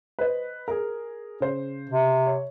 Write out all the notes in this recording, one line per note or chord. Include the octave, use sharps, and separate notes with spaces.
B4 C5 D#5
G#4 A#4
C#3 C5
C3
C#5